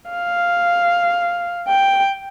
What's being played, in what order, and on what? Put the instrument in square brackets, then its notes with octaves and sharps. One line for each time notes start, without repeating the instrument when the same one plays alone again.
[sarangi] F5
G5